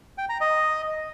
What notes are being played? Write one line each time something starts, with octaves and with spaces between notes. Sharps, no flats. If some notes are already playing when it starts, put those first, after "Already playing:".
G5
A#5
D#5